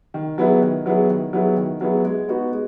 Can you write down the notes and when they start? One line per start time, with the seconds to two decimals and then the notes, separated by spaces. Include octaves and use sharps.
0.14 D#3
0.38 F#3 B3 E4 G#4
0.62 D#3
0.86 F#3 B3 E4 G#4
1.09 D#3
1.33 F#3 B3 E4 G#4
1.57 D#3
1.81 F#3 B3 E4 G#4
2.04 G#3
2.28 B3 D#4 F#4
2.52 G#3